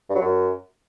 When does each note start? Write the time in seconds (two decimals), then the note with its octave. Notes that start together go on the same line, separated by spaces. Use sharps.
0.10 G2
0.15 F#3
0.21 F#2